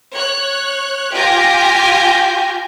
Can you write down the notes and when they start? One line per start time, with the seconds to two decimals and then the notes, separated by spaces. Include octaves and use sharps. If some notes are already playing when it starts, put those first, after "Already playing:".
0.14 C#5 F#6
1.12 F4 G4 G#5 G6 A#6